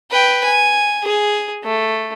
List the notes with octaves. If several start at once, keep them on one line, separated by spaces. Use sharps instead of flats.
B4 G5
G#5
G#4
A3